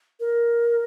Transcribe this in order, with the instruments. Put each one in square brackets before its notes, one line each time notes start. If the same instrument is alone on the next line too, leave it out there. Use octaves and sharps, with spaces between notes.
[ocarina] A#4